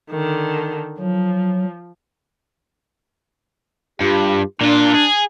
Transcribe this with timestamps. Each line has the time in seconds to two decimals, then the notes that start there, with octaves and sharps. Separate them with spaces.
0.11 D3 D#3
1.00 F3 F#3
4.00 G2 F4 G4
4.61 A#2 D4 F4
4.94 G#4